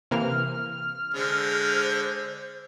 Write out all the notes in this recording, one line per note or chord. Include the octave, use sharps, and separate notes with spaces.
C3 E3 A#3 F6
D3 G#3 C5